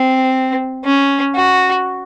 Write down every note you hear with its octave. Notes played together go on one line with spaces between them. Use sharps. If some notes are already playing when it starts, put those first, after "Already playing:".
Already playing: C4
C#4
F#4